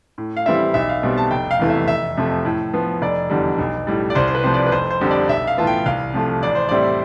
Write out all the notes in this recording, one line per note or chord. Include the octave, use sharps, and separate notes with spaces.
A2
F5
E3 G3 C4 E4 E5
B1 E5
F5
B2 G3 C4
A5
F1 G5
F5
E2 C3 E3 A3
E5
F1 E5
F2 C3 F3 A3
A2
F3 B3
F1 D5
E2 D3 G3
B1
A2 G3
D5
C2 C5
C5
B4
C3 F3 C5
D5
B4
F1 C5
C5
F2 D3 G3 C4
D5
B1 E5
F5
A2 E3 B3 F4 A5
G5
C2 F5
C3 F3 A3
A1 D5
C5
A2 G3 C4 E4 D5